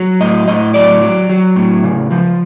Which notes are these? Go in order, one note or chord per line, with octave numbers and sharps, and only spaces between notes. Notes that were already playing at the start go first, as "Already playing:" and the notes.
Already playing: F#3
A2 D#5
A2 D#5
F#3 D5
F#3
F#3
A2
C#3
F3